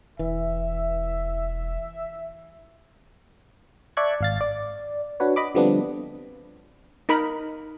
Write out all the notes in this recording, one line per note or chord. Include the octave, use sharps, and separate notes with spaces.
E1 E3 E5
D5 E5 A5 C#6 F#6 G#6
G#1 F5 A6
D5
D4 F#4 B4 C#5
D#5 B5 D6
D3 F3 G3 B3 C4 D4
D#4 A#4 B5